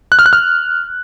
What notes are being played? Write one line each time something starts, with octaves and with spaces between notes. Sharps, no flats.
F#6
F6
F#6
F6